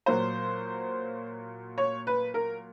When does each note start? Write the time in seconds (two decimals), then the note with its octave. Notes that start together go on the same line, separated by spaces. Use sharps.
0.06 A#2 F#3 A#3 C5
1.78 C#5
2.07 B4
2.34 A#4